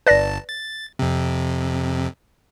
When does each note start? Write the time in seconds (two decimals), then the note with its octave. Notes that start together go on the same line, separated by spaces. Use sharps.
0.07 G1 B4 D5 A5 A#6
0.49 A6
0.99 F2 C3